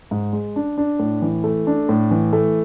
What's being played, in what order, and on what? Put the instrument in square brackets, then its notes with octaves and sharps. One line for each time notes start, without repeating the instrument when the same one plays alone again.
[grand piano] G#2
G#3
D4
D4
A2
E3
A3
D4
A2
E3
A3